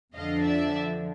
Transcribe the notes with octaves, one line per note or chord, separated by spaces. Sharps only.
F2 D3 F3 D#5 F5
D5 E5